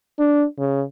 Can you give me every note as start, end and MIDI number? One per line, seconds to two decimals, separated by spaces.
0.19 0.45 62
0.59 0.82 49